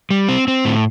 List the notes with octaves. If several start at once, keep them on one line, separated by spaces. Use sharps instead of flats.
G3
C4
C4
A2